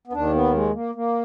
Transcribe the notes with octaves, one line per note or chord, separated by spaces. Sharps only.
B3
D#2 D#3 D4
B3
G#3
A#3
A#3